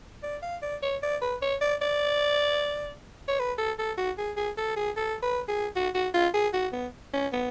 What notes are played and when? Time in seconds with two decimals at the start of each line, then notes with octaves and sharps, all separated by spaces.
0.23 D5
0.43 F5
0.62 D5
0.83 C#5
1.03 D5
1.22 B4
1.42 C#5
1.61 D5
1.82 D5
3.28 C#5
3.39 B4
3.58 A4
3.79 A4
3.98 F#4
4.18 G#4
4.37 G#4
4.58 A4
4.76 G#4
4.97 A4
5.22 B4
5.49 G#4
5.76 F#4
5.95 F#4
6.14 F4
6.34 G#4
6.53 F#4
6.73 B3
7.13 C#4
7.33 B3